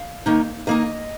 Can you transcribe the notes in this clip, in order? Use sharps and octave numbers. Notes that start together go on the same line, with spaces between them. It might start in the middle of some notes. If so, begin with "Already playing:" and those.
Already playing: F5
D#3 A#3 D#4
D#3 A#3 D#4 D#5